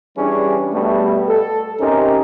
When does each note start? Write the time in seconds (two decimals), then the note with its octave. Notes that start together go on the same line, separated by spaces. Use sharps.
0.17 E3 G3 C#4 D4 G#4
0.73 B2 G3 A3
1.28 A4
1.80 C3 C#4 D#4 G4 A#4